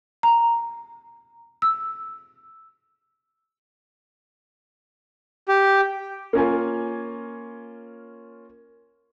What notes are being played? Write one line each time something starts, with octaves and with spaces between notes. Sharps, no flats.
A#5
E6
G4
A#3 C#4 F4 G#5